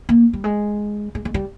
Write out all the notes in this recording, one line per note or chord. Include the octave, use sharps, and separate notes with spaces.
A#3
G3
G#3
G#3
G#3
G3